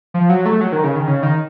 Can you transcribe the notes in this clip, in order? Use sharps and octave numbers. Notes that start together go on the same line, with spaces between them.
F3
F#3
A3
F#3
D#3
C#3
D#3
C#3
D#3